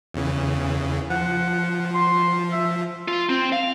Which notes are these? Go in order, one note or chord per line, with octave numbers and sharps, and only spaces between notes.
E2 C#3 E3
F3 F#5
C6
E5
F4
C4
F5